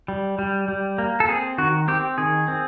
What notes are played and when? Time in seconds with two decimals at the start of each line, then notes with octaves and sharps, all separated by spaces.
0.08 G3
0.39 G3
0.68 G3
0.98 A#3
1.20 A4
1.28 C4 G#4
1.58 D#3 F#4
1.88 C4 G4
2.18 D#3 G#4
2.48 C4